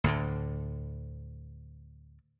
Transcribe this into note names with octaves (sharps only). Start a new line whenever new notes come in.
D2 A2 D3